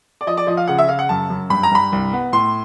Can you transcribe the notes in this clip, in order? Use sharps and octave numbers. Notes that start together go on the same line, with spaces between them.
D5
F3 D#5
D5
F3 D#5
F5
C#3 F#5
E5
C#3 F5
F#5
F#2 A5
F#2
G2 B5
A#5
G2 B5
C2
B3
A2 C6